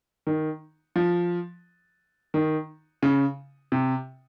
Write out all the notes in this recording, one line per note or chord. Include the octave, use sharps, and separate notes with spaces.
D#3
F3
D#3
C#3
C3